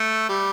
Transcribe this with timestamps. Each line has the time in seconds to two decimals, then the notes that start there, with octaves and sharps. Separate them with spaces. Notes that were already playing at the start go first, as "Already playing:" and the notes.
Already playing: A3
0.29 G3